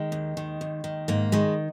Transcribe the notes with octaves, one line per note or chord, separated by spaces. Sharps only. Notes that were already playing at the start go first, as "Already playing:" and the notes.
Already playing: D#3 G#3
D#2
D#3
D#2
D#3
G#2 A#3
D#3 G#3